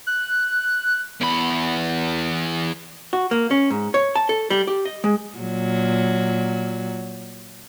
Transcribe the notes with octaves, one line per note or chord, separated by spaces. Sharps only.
F#6
E2 B5
F#4
A#3
C#4
G#2
C#5
A5
A4
G3
G4
D#5
G#3
A#2 F#3